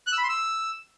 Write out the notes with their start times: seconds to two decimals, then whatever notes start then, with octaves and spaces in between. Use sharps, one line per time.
0.07 F#6
0.12 E6
0.18 B5
0.23 C6
0.29 E6